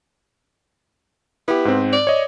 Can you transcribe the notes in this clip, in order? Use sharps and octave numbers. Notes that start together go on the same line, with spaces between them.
B3 E4 G4
G#2 C4
D5
C#5 D#5